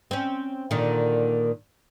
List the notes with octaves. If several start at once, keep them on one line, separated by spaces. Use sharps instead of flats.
C4 C#4
A#2 D3 D#3